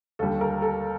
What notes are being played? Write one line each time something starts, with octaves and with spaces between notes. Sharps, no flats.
D#2 D3 G3 A4
A#4
A4